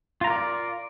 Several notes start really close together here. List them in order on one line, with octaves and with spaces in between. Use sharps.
F4 A#5 A#4 D5